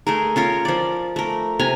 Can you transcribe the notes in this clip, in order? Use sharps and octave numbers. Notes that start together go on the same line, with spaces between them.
A3 G#4 A#4
C#4 F4 A#4 C#5
F3 D5
A3 A#4
C3 G#5 A#5